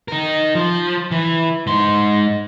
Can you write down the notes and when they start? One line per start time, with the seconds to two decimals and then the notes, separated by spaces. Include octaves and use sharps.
0.08 D#4 A#4
0.55 F3
1.11 E3
1.67 G#2 C6